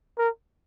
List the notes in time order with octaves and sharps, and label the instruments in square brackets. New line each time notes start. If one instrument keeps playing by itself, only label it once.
[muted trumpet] A#4